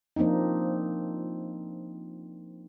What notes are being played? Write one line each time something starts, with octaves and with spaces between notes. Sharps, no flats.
F3 A#3 C4 D4 D#4